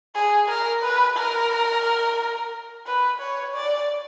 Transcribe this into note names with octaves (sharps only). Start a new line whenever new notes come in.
G#4
A#4
B4
A#4
B4
C#5
D5